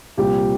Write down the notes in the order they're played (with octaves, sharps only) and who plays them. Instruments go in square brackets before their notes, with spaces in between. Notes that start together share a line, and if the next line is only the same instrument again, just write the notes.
[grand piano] C2 A#2 F3 G4